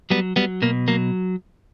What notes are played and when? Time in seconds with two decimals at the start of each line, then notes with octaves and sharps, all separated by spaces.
0.10 F#3 G3 B3
0.36 F#3 G3 B3
0.62 B2 A#3
0.88 F#3 A#3